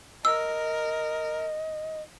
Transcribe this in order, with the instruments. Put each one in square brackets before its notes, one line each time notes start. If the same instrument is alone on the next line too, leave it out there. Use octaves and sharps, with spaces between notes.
[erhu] A#4 [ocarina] D#5 [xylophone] E6